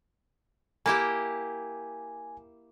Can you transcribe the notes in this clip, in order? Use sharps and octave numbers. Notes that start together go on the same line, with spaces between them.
A#3 E4 G4 G#5